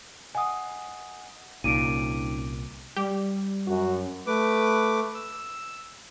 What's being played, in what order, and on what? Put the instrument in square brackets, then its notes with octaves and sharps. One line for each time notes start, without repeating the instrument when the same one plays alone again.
[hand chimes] D#5 F#5 [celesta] G#5 D#6
[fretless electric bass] C2 A#2 [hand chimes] C#4 D#4 D6 [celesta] D7 D#7
[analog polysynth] G3 [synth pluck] G4
[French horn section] F#2 [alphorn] F#4
[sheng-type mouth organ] A3 B4 D6
E6